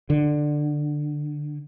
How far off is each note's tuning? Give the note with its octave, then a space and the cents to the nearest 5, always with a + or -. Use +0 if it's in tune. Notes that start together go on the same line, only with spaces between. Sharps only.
D3 +15